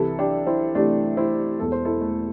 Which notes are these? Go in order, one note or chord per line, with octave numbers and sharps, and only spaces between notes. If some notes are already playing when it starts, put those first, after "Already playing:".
Already playing: C2 C3 E3 E4 A4
D4 G4
C4 E4
C2 C3 E3 A3 D4
C4 E4
E1 E2 E3 A4
C5
E4 A4
A3